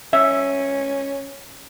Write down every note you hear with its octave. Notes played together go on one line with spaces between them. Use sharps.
C#4 E5